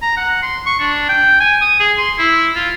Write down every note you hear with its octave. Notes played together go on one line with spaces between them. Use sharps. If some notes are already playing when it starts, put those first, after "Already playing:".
A#5
F#5
C6
C#6
D4
G5
G#5
D#6
G#4
C6
E4
F4